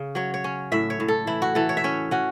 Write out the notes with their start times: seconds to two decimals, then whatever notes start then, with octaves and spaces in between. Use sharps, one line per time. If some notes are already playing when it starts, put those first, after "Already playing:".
Already playing: C#3
0.15 F#3 C#5
0.34 C#5
0.44 C#4
0.72 A2 E5
0.90 C#5
1.00 A2
1.08 A4
1.27 E3 E4
1.42 F#4
1.55 E3 A4
1.69 C#5
1.77 E5
1.84 C#4 C#5
2.11 C#4 F#4